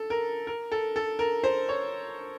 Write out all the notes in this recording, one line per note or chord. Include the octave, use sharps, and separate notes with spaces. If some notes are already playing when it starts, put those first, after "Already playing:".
Already playing: A4
A#4
A#4
A4
A4
A#4
C5
C#5